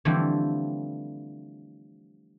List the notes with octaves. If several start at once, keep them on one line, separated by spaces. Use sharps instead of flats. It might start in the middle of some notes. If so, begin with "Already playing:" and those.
D3 E3 F3 G3 A3 C4